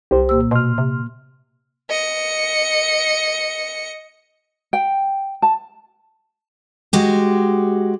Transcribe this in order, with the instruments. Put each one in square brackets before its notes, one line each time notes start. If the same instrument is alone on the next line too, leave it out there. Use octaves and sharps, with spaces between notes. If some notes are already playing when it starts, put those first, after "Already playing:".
[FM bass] C2 [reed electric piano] G4 C5
[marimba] A#2 A#3 E6
[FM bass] B2 [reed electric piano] C6 F6
[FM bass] C3
[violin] D#5 C#7
[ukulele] G5
A5
[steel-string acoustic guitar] G#3 F#4 G4